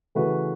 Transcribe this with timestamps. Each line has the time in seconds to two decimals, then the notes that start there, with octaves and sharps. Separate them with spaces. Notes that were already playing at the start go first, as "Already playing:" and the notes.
0.15 C#3 E3 A3 F#4 B4